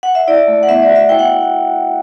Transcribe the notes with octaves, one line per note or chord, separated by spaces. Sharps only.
F#5
E5
E4 D5
A3
F#5
B3 E5
D5
F#4
E5
E4 G5
F#5